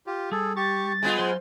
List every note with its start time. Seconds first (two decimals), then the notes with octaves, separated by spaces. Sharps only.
0.07 F4 G4
0.32 G3 G#4 A4
0.56 G4 C#6 A6
1.03 G#3 B3 F4 G#5
1.18 F#3 C5 C6